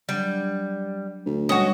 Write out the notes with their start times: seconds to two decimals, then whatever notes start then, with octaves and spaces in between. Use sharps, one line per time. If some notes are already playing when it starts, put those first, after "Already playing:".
0.09 F#3 G3 D4
1.26 D2
1.49 B2 G3 G#3 C#4 F#4 D#5